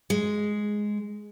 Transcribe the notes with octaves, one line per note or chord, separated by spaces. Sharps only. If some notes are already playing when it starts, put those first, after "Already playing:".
G#3